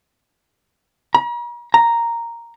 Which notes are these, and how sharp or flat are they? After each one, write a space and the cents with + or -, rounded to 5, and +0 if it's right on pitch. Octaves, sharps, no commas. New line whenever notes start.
A#5 +45
A#5 +0